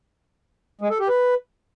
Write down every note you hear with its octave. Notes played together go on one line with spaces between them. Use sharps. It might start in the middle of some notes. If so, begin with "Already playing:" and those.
G#3
A4
G4
B4